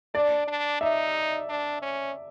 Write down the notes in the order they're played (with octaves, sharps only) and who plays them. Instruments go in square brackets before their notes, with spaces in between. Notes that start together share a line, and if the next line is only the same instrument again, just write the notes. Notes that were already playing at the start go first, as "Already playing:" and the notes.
[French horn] D4 [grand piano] D5
[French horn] D4
[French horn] D#4 [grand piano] E5
[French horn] D4
C#4